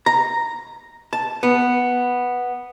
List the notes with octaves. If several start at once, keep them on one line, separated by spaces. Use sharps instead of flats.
A#5
A5
B3